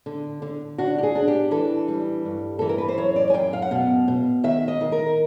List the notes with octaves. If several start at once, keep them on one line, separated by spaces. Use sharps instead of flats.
D3
D3
D4 F#4
G4
G#4
D4
G4
E3 A4
G3
G2
E3 A4
A#4
B4
C5
F#2 C#5
D5
G#5
F#2 G5
F5
F#5
B2 F5
B2
D#3 E5
D#5
D#3
A#4